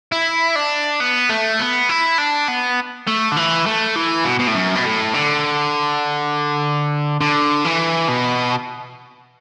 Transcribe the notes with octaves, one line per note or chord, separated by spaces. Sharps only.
E4
D4
B3
A3
B3
E4
D4
B3
A3
D3
E3
A3
E3
B2
B2
A2
F#2
B2
A2
D3
D3
E3
B2